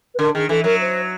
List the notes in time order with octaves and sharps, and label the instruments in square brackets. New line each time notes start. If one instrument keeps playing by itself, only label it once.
[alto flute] B4
[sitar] D3 [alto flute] A#4
[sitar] D#3 [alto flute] G#4
[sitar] E3 [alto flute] A4
[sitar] F#3 [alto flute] A#4
[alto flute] C5